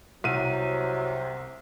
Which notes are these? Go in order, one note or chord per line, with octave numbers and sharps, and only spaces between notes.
C2 C3 F#3 D#7